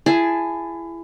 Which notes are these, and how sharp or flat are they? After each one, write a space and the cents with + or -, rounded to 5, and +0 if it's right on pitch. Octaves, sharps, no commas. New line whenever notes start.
E4 +25 G#4 +0 A5 +0